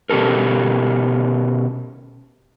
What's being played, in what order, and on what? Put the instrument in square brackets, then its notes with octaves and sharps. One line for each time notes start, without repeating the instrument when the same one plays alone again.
[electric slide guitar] B2 C#4 G4 A4 A#4